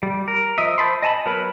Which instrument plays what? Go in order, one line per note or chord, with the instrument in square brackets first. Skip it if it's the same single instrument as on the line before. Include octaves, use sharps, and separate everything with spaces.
[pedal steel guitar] G3
A#4
F3 D#5 E5
C5 A5 B5 C6
D#5 G#5 A5 B5
F#3 B3 A#4 B4 B5